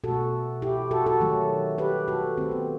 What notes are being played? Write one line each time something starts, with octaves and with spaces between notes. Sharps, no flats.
B2 A3 F#4 A4
E4 G4
F#4 A4
F#4 A4
D#3 F#3 A3
G4 B4
F#4 A4
D#3 A3 C4
B3